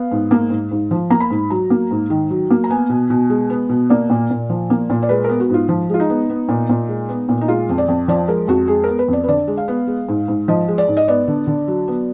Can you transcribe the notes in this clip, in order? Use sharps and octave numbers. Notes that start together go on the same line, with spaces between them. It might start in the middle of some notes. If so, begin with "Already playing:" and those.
Already playing: B3 F5
G#2
A#3
G#2
G#2
F3
A#3 A#5
B5
G#2
F#3 A#5
A#3
G#2
D#3
F#3
A#3
A#5
B3 G#5
B2
B2
G#3
B3
B2
A#3 D5
A#2
A#2
F3
A#3
A#2
D5
G#3 B4
B3 A#4
F#4
G#2 F4
F3
G#3 F4
D#4
B3
B3
A#2
A#2
G#3
B3
A#2
D#4
G#3 F4
F2
D5
F2
F3 D5
G#3 A#4
F2 F#4
G#3 G#4
B3 A#4
B4
F2
D5
B4
D3 D5
G#3
F5
B3
G#3
G#2
G#2
F3 D#5
G#3
D5
G#2
D#5
B3 D5
D3
D3
F#3
B3